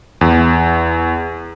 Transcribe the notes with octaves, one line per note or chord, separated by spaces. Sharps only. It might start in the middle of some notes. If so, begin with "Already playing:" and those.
E2